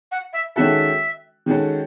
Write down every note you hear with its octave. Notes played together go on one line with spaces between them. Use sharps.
F#5
E5
D#3 G#3 C#4 F#4 A4 E5
D#3 G#3 C#4 F#4 A4